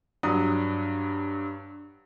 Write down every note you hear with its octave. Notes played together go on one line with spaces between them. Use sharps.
G2 F#3 D#6